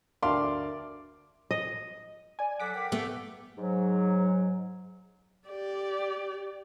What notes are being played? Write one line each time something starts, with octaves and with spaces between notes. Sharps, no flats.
D2 A#4 D5 E5 F5 G5 A5 C6
D#5
D5 G#5
F#3 A4 F#5 D6 B6
A#4 F#5 G5
A3 B3
G#2 F#3
G4 D5